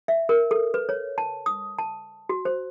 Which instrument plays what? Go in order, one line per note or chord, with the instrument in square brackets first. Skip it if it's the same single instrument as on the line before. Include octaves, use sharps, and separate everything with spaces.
[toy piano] E5
A#4
A4
B4
C#5
A5
D#6
A5
F#4
C5